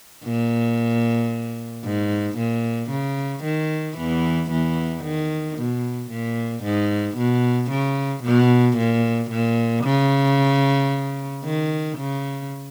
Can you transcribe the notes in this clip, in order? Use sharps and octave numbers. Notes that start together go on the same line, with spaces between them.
A#2
G#2
A#2
C#3
D#3
E2 E3
E2 E3
D#3
B2
A#2
G#2
B2
C#3
B2
A#2
A#2
C#3
D#3
C#3